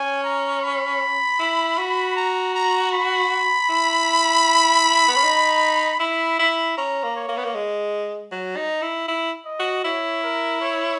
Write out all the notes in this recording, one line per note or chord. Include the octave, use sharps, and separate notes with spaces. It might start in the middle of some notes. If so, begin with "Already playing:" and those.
Already playing: C#4 G#5
A#5
B5
E4
F#4
A#5
A#5
B5
E4
B3
C#4
D#4
E4 B5
E4 B5
C#4 A#5
A#3
C#5
A#3
B3
A#3
G#3
F#3
D#4
E4
E4
D#5
F#4
E4 C#5
A#4
C#5